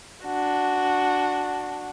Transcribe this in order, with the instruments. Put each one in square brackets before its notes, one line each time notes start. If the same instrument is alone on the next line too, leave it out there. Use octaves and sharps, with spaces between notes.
[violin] D4 F#4